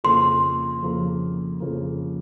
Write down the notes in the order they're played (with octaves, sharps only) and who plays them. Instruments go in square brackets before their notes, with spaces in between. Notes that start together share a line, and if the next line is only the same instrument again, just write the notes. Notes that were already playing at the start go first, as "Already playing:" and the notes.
[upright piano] F2 C#3 F3 A#3 [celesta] C6
[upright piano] F2 C#3 F3 A#3
F2 C#3 F3 A#3